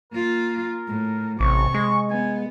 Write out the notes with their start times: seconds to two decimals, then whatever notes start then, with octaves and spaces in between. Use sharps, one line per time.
0.12 A#3 F4 A#4
0.87 A2
1.40 A1 C3 C#6
1.74 G#3
2.10 B3 G#5